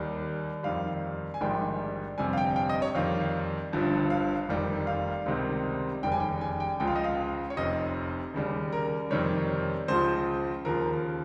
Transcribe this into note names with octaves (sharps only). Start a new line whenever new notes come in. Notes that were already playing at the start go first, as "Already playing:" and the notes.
Already playing: D#2 D#3 G3
F2 D#3 G3 F5
G#5
A#1 G#2 D#3 G3 G5
G1 F2 C3 G3 G#5
F5
G5
G5
D#5
C#5
F2 D#3 G3 F5
G1 G2 F3
F5
F1 F2 D#3 G3
F5
C#2 C3 D#3 G3
F1 D#2 C#3 G3 G5
G#5
G5
G#5
G5
C#2 C#3 F3 G5
F5
D#5
F5
C#5
F1 F2 C3 D#5
D#2 C#3 G3
A#4
F2 C3 D#3 G3 C#5
C#2 C#3 F3 C5
D#2 C#3 F3 A#4